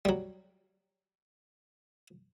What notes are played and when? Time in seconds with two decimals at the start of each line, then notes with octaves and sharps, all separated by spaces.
0.05 F#3 G3